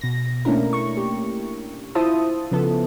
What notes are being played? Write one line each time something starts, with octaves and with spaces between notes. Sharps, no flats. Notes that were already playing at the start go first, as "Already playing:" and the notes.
B2 A#6
A3 A#3 C#4 D4 E4 A#4
C#6
G4
E4 F4 C5 E5 A5 D#6
C#3 F3 B3 A4